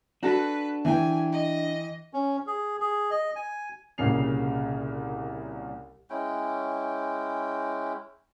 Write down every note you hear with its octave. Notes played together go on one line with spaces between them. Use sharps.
D4 F#4 A4 B4
E3 G5 G#5
D#5
C#4
G#4
G#4
D#5
G#5
C2 A#2 C#3 C7 F7
G#3 C#4 E4 G5